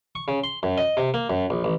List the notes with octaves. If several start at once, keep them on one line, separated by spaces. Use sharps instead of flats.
C#6
C#3
C6
F#2
D#5
C3
A#3
F#2
A#1
A1